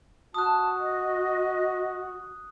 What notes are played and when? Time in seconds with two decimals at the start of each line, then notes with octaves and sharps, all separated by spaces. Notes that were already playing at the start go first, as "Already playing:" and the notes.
0.34 F#4 A5 D#6 F#6
0.78 D#5